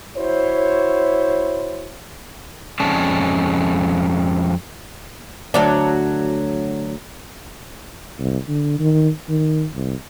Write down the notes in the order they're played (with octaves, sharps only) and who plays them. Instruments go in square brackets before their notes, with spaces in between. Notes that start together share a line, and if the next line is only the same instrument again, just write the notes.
[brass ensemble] E4 F#4 C5 C#5
[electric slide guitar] F2 G#3 C#4 D5 A5
[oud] D2 F#3 D4
[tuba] C2
D3
D#3
D#3
C2